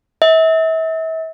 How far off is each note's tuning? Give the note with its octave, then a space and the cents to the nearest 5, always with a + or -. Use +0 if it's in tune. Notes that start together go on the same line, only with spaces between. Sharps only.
E5 -35